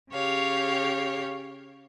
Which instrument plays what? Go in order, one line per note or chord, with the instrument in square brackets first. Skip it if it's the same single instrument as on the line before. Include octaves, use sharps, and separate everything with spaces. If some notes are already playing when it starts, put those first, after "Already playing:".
[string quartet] C#3 G4 C#5 F5